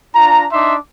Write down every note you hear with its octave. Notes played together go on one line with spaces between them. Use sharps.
D4 F4 A#5
D4 D#4 E5 C6 D6